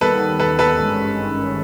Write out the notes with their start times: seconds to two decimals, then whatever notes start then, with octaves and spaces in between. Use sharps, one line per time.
0.01 D#2 D#3 G3 B3 A4 B4
0.40 A4 B4
0.59 A4 B4
0.78 G#1 G2 D#3 G#3 C#4